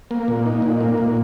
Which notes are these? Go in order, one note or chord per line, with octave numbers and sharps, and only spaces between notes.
A#3
A#2
D#4
A#2
A#3
A#2